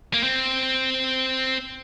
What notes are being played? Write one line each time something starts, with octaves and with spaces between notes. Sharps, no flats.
A#3
C4